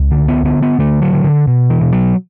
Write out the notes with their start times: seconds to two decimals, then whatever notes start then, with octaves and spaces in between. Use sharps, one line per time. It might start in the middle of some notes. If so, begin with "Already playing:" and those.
Already playing: C#2
0.11 D3
0.28 B3
0.45 D3 B3
0.62 B3
0.79 D3 A3
1.02 F#3
1.13 D3
1.24 D3
1.47 B2
1.70 E3
1.81 B2
1.93 F#3